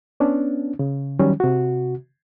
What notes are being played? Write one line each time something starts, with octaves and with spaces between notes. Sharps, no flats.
B3 C#4 D4
C#3
D#3 F#3 G3 C#4
C3 F#4